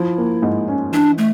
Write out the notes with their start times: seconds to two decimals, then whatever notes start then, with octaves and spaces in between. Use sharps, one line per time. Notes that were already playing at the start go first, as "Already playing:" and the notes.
Already playing: F3 E4
0.18 A#3
0.42 G#2
0.68 C#4
0.92 E3 D4
1.18 A3